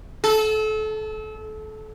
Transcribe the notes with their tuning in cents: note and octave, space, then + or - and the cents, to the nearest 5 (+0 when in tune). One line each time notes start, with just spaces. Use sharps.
A4 -30